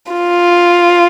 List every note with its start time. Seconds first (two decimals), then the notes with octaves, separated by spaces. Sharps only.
0.12 F4